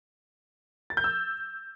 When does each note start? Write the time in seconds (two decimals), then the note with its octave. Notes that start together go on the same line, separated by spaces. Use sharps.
0.90 A6
0.97 G6
1.04 E6